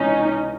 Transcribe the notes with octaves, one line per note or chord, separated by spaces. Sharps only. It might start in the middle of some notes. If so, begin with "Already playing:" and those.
Already playing: C#2 C3 E3 C#4 D#4